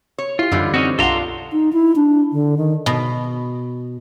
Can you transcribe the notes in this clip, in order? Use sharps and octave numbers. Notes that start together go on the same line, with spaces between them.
C#5
E4 F4 G4
F#2 D3 E3 G3 D#4
C4 C#4 D#4 F#4
B1 F#2 D4 F4 A4 F#5 A#5 C6
D#4
E4
D4
D3
D#3
B2